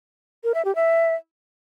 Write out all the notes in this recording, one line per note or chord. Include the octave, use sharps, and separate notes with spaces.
A#4
E5
G4
E5